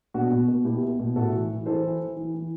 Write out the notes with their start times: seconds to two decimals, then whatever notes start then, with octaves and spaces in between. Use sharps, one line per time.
0.14 B2 D4 F#4
0.31 B2
0.48 B2
0.65 B2 E4 G4
0.83 B2
1.00 B2
1.16 A2 F#4 A4
1.33 E3
1.50 E3
1.66 E3 A4 C5
1.83 E3
2.00 E3
2.17 E3
2.34 E3